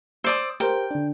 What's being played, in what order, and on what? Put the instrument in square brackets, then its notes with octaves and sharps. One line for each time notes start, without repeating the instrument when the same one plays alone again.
[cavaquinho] C5 D5 D#6 [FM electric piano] E6
[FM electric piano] G4 A#4 C5 [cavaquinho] G5
[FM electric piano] D3 D4